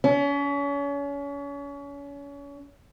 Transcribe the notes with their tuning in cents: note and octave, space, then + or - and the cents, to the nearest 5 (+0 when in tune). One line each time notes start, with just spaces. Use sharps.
C#4 +35